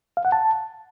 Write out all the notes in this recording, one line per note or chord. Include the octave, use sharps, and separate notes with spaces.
F5
F#5
A5